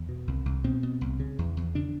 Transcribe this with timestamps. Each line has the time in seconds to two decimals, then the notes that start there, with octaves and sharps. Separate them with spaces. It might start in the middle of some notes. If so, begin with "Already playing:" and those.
Already playing: E2
0.09 B2
0.27 C2
0.45 C2
0.64 B2 C4
0.83 B2
1.01 C2
1.20 C#3
1.39 E2
1.57 E2
1.75 C#3 D4